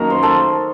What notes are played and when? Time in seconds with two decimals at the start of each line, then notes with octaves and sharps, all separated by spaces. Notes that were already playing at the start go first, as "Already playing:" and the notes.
Already playing: F#2 D#3 F#3 A#3 D#4 F#4 A#4
0.10 C5
0.23 A4